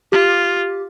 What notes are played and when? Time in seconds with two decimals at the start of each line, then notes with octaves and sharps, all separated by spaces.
0.12 F4 G4